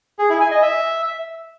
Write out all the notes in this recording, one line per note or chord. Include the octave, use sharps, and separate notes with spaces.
G#4
E4
G#5
D#5
E5